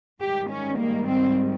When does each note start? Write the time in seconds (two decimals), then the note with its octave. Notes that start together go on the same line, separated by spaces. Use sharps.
0.21 G#2 D#3 G3 G4
0.50 C#4
0.79 A#3
1.08 C4